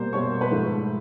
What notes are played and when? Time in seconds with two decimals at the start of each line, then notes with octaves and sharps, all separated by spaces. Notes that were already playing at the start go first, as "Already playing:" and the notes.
Already playing: B2 G3 A#3 C5
0.13 B2 G3 A#3 C#5 C#6
0.41 B4 B5
0.51 G#2 F3 A3